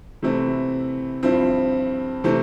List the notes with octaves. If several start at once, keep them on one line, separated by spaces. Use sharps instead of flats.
C3 E3 A3 C4 E4
G2 F3 C4 E4
C3 E3 A3 C4